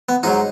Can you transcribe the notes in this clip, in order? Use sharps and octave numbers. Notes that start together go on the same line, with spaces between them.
B3
G#2 F#3 D#4